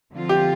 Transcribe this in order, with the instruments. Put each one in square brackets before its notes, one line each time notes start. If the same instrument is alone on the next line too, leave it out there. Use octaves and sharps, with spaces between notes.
[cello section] D3 F3 C4 F4
[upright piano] G4